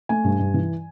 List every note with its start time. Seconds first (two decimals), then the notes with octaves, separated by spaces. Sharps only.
0.09 A3 G#5
0.24 G2
0.39 G2
0.54 E3